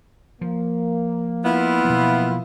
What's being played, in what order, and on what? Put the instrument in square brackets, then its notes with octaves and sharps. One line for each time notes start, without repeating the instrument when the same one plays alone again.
[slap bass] F3 [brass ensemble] A#3
[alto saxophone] B3 [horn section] E4 F4
[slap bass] B2 F3 F#3